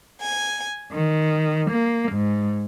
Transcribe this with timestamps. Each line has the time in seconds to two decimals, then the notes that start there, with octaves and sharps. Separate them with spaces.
0.21 G#5
0.91 D#3
1.70 A#3
2.12 G#2